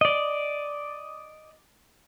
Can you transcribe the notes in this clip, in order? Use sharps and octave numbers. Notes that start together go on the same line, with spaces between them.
D5 D#5